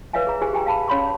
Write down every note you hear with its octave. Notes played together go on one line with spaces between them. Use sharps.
B4 C#5 E5 F5 G#5
G#4 A#5
G4 G#4 C5 G#5
G4 G5 G#5 A#5
F5 A5 B5
C#4 C#5 F5 B5 C6 D6